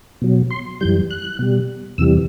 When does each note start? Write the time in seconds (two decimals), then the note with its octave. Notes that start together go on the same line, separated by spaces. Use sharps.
0.22 B2 F#3
0.51 C6
0.81 F#2 E3 G3 G6
1.11 F#6
1.39 B2 G3
1.98 E2 C3 E3 G3 E6